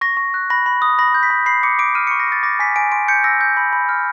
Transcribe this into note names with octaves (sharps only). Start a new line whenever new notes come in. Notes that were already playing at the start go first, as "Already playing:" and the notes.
C#6 A#6
C#6
F#6
B5 A#6
B5
D#6
B5 A#6
G6
B6
B5
B5 C7
D6 C#7
D6 D7
F6 D#7
C#6 C#7
A#6
C#6 A6
D6 A#6
G#5 B6
G#5 D7
C6 D7
G6 C#7
E6 A#6
G6
B5
B5
F6